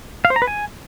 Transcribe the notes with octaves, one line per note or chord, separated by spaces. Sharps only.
F5
C5
A#5
B4
G#5